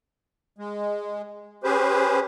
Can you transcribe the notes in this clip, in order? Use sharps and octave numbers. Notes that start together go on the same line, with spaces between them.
G#3
C#4 G4 G#4 B4 C5